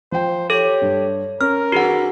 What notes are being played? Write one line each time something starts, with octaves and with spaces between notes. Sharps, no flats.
F3 C5 G5
G4 A4 C#5
G2
C#4 A#4 F6
G2 E3 F#4 G#4 F#5